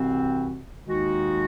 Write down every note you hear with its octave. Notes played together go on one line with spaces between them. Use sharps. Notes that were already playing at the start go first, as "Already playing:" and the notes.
Already playing: C2 C3 E3 C4 F#4
D#2 D#3 G#3 D#4 F#4